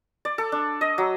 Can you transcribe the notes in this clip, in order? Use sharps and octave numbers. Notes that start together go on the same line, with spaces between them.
D5
A4
D4
D#5
F#3